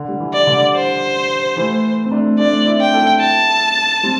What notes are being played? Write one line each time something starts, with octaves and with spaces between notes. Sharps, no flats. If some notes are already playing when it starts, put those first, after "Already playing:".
Already playing: D3
G3
E3
D5
D3 G3
C5
E3 A3
C4
A3 D4
A3 D4 D5
C4 E4
G5
E4 A4
A5
G3 C4